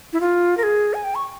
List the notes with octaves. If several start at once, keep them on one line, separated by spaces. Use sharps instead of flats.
E4
F4
A#4
G#4
G#5
G5
C#6